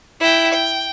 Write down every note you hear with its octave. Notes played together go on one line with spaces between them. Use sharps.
E4 G5
G5